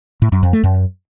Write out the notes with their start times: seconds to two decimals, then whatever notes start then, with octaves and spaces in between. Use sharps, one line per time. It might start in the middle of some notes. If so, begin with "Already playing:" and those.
0.22 A2
0.32 F#2
0.43 F2
0.53 A3
0.63 F#2